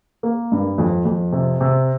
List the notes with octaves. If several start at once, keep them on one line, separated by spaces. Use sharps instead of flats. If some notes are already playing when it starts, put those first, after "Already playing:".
A#3
G2
F2
F2
C3
C3